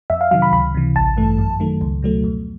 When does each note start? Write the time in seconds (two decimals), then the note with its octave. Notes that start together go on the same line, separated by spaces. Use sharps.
0.10 F2 E5
0.21 F5
0.31 C3 D#3 F#3 F5
0.42 B5
0.53 C#2 B5
0.75 C3 E3
0.96 A1 A5
1.17 G2 E3 A3
1.38 F#2
1.60 D#3 F#3 A3
1.81 C#2
2.03 B2 F#3 A3
2.24 F2